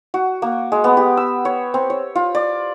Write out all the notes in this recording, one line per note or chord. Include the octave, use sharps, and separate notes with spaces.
F#4
A#3
G#3
B3
G4
E6
C#5
C4
C#5
F4
D5